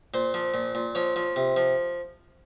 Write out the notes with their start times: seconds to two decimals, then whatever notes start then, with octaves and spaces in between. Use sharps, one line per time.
0.14 A#2 C5
0.34 F3
0.54 A#2
0.75 A#2
0.95 F3 C#5
1.16 F3
1.36 C3
1.57 F3